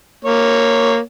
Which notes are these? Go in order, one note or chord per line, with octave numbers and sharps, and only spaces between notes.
A#3 C#5